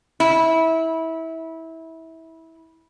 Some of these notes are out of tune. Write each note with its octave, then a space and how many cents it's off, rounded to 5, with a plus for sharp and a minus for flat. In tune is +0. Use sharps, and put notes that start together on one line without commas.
E4 -20